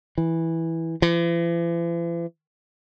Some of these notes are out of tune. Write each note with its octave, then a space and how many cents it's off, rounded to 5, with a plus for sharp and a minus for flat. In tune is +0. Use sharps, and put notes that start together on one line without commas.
E3 -5
E3 +45